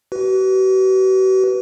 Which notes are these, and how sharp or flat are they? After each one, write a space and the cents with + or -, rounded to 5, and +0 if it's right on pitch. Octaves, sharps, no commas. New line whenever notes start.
F#4 +45 B4 +0